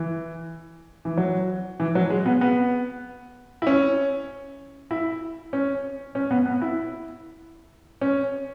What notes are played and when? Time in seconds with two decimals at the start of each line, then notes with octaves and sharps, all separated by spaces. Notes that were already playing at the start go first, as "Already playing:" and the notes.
Already playing: E3
1.05 E3
1.17 F#3
1.80 E3
1.95 F#3
2.10 G#3
2.26 B3
2.41 B3
3.62 E4
3.67 C#4
4.91 E4
5.53 C#4
6.15 C#4
6.31 B3
6.46 B3
6.62 E4
8.01 C#4